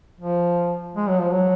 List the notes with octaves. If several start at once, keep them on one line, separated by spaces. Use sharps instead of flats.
F3
G#3
F#3
F3
F#3